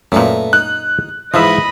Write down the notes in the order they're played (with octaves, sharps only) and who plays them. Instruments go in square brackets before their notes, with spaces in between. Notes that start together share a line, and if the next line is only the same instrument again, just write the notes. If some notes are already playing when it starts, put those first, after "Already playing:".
[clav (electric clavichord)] F#2 A#2 [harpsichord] A3 B4 A#5
[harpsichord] D#4 [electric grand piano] F#6
[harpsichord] G#2 E3 D#4 [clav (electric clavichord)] F3 E5 [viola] D#5 B5